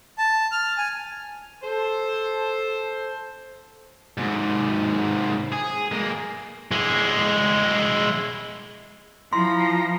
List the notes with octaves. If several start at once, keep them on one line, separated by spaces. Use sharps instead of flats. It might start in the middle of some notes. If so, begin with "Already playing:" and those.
A5
F6
G#5
A4 C5
G#2 C3
G#4
G#3 A#3
G#3 E4
F3 E4 A#5 C6